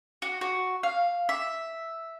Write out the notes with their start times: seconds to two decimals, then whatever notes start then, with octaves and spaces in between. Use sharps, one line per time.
0.22 F#4
0.41 F#4
0.83 F5
1.29 E5